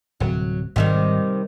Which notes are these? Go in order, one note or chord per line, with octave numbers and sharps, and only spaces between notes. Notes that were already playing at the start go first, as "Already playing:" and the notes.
D1 C3 F#3
G#1 C3 D#3 G3